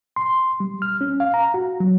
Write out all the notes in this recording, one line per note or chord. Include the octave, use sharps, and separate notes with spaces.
C6
G3
F6
C#4
F5
A#5
F#4
F#3